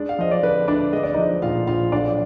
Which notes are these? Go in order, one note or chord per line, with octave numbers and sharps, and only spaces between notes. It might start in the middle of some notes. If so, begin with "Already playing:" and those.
Already playing: G#3 D4 D5
F5
F3 D#5
D5
D3 B4
D2 D4 D5
G#3 D#5
D5
F3 D#4 D#5
A#2 F4 F5
A#1 F4 F5
B1 D4 D5